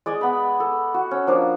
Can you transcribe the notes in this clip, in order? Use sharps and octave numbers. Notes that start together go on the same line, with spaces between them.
G#3 D5 D#5 G#5
B3 B5
A4
F#4
C#4
F3 A#3 D4